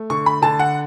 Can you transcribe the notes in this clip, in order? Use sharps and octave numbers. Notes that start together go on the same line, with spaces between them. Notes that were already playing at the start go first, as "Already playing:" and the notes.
Already playing: A3
D3 C#6
B5
D3 A5
F#5